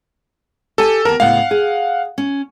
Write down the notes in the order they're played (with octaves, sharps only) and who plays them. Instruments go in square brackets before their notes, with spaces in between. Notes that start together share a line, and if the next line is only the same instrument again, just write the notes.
[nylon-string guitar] G4 G#5 [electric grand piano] A4
[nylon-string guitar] D#2 B3 A5 [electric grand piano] A#4
[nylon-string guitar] A2 C#3 B3 [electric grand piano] F5 F#5
[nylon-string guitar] G#4
C#4